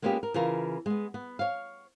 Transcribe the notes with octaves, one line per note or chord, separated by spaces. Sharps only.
G#3 A#3 B3 C#4 F4 G4
A#4
C#3 E3 F4 A#4 A5
G#3 B3
B3
C#5 F5